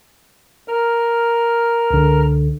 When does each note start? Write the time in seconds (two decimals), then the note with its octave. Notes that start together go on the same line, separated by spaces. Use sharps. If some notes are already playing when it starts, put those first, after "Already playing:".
0.68 A#4 F6
1.90 C#2 D3